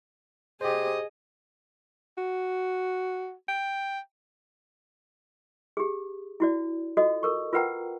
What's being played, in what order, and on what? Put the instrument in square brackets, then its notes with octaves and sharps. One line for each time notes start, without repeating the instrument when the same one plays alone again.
[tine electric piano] G4 C5 [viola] G#4 D#5
[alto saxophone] F#4
G5
[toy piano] G4 G#4
E4 F#4 D5
F4 F#4 A4 D#5
A4 A#4 C#6
F4 A#4 B4 F#5 G5 A#5